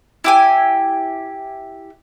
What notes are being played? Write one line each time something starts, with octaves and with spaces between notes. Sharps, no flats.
E4 G4 G#5